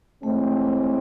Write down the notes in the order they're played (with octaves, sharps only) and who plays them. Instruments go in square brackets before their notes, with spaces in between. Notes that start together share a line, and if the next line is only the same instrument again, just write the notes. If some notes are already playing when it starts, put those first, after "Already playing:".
[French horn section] A2 E3 G#3 C4 [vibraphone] A3